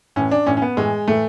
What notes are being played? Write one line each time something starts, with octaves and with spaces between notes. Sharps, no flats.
A2 E3 C#4
D4
A2 E3 C#4
C#4
B3
A2 E3 G#3
A2 E3 A3